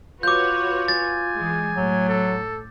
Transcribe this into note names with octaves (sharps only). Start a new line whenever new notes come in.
F4 F#4 B4 C#5 D6 G6
G#5 A6
E3 G#3
A2 F#3
A4